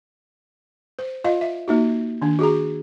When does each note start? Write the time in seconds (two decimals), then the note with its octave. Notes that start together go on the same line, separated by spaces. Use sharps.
0.99 C5
1.24 F4 D#5 F5
1.41 E5
1.68 A#3 D#4 F#4
2.22 D#3 D4
2.39 F#4 G#4 A#5